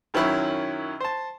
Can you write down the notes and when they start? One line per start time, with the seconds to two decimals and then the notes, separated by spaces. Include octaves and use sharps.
0.14 F#2 D#3 F#3 C#4 E4 B5
1.00 C5 A5